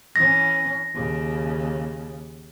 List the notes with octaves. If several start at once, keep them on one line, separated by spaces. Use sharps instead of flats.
E3 C#4 A#6
D#2 C#3